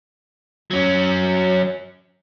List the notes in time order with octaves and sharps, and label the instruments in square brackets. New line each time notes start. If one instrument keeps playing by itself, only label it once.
[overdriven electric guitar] F#3 C#4